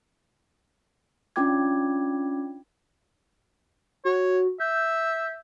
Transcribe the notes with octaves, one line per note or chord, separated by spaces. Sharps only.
C#4 D4 F4 G5 D6 G#6
F#4 C#5
E5 G6